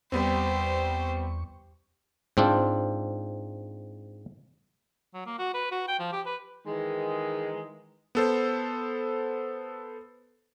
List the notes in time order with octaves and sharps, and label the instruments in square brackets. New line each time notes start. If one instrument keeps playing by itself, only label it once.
[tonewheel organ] E2 C#6 [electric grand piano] G3 B3 C4 [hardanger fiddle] G4 C5
[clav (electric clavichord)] G#2 C4 D4 F4
[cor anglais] F#3
A#3
F#4
B4
F#4
G5
F3
G4
B4
[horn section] D#3 E3 G#3
[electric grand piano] B3 A4 C5